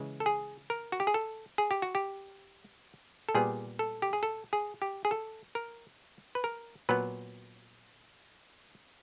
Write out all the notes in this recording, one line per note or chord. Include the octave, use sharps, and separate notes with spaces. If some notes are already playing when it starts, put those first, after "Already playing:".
Already playing: C#3 E3 G#3
A4
G#4
A#4
F#4
G4
G#4
A4
G#4
G4
F#4
G4
A4
A#2 G3 B3 G#4
A4
G4
G#4
A4
G#4
G4
G#4
A4
A#4
B4
A#4
A#2 F#3 B3 B4